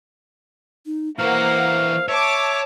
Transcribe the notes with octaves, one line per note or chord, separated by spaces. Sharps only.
D#4
E3 A#3 F#4 C5 F5 F#5
C#5 E5 A5 D6